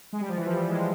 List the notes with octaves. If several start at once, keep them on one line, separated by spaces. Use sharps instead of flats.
G#3
G3
F3
E3
F3
G3
G#3